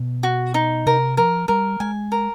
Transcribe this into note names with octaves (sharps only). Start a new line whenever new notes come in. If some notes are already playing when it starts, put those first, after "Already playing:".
Already playing: B2
F#4
D#4
C3 A#4
F3 A#4
G3 A#4
G#3 G#5
A#4